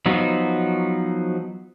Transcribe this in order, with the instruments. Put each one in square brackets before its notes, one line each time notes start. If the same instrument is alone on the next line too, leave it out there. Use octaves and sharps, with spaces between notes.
[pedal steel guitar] F3 F#3 B3 D#4